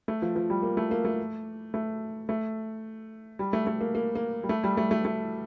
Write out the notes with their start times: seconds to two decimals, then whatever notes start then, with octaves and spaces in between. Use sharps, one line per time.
0.08 A3
0.22 F3
0.36 F3
0.50 G3
0.63 A#3
0.77 A3
0.91 A#3
1.05 A3
1.74 A3
2.29 A3
3.39 G3
3.53 A3
3.67 A3
3.81 A#3
3.95 A#3
4.15 A#3
4.43 G3
4.49 A3
4.64 G3
4.77 A3
4.91 A3
5.05 A3